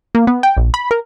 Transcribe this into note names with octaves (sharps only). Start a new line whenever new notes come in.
A#3
B3
G5
A#1
B5
A#4